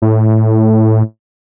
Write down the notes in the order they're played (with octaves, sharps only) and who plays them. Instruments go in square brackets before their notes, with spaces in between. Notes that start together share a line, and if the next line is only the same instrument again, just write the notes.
[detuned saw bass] A2